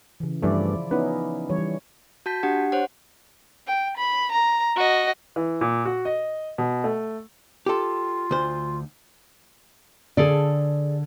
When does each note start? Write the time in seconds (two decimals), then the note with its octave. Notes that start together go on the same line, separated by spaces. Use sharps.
0.20 C#3 E3
0.42 G2 E3 F3 A3 E4 D5
0.91 B3 C#4 D#4 E4 B4
1.50 E3 G3 C#5
2.26 F#4 A5 G6 B6
2.43 D4 G4 F#5
2.72 C5 C#5 F#5
3.67 G5
3.97 B5
4.31 A#5
4.76 F#4 D#5
5.36 E3
5.61 A#2
5.85 F#4
6.05 D#5
6.58 B2
6.84 A3
7.66 F4 G4 A4
8.31 D2 C5
10.17 D3 G#4 A4 D5